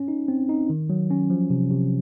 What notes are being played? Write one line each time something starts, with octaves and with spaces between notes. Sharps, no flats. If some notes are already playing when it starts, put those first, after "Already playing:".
Already playing: C#4
D#4
C4
D#4
D#3
F#3
C#4
F3
C3
C3